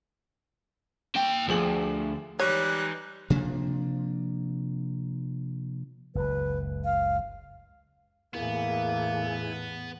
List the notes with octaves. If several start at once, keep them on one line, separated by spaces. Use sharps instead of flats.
A#3 G5
D2 F3 G#4 F#7
E3 G3 G#3 D#4 C#5 F#6
C3 F3 A#3 D4
F#1 C#2 B4
F5
E2 A2 A#3 B3 E4 G#4